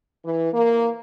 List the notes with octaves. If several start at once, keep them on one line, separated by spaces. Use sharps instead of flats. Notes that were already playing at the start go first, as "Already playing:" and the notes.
E3
A#3